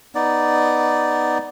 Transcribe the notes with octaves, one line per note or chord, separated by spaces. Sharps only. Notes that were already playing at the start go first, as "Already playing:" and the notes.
B3 D#4 D5